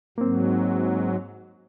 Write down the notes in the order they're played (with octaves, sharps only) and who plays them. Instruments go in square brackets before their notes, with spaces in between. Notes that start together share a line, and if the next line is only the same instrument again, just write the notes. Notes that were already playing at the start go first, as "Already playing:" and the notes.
[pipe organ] G#2 F#3 [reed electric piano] A#3 C4